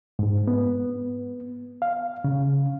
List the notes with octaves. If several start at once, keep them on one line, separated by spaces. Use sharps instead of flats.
G#2
B3
F5
C#3